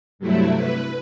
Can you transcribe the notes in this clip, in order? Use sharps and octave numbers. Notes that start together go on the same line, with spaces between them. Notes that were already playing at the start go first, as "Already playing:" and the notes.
G2 C3 F#3 A3 E4
B4